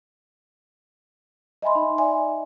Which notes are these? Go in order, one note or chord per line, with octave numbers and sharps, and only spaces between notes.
D#5 E5 G#5 B5 C6
D#4
D5 E5 G#5